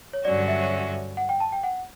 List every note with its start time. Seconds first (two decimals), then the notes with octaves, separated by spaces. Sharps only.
0.13 C#5
0.24 G2 D3 F#3 C#4 F#4 D5
0.48 E5
1.17 F#5
1.29 G5
1.40 A5
1.52 G5
1.63 F#5